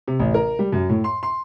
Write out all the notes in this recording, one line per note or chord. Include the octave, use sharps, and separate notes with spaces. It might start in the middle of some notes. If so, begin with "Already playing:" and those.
C3
A1
A#4
G3
F#2
A2
C6
C6